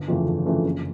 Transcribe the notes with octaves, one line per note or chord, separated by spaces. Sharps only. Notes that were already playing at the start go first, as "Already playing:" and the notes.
Already playing: G1
F2 C#3 E3 A3
G1
F2 C#3 E3 A3
F#1